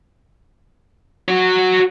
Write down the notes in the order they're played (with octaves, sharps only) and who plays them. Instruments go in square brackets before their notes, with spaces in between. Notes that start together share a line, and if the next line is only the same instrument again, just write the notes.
[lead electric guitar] F#4 C#5